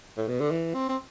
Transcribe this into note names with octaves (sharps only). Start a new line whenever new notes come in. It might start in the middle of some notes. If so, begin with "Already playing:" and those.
A2
B2
D3
E3
C4
C4